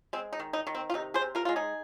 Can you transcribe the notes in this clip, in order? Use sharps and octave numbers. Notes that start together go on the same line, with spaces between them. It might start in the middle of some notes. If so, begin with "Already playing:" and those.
G#3 C4
D#4
D#3
D#4
D#3
C4
F4
C3 D#4
G#4 C5
C3
F4 A#4
G#3 F4
D#4 G#4